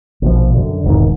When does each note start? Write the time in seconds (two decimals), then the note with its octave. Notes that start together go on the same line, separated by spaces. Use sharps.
0.22 A#1 B2 F3
0.54 F#2 D3
0.84 E1 C2 G#2 D#3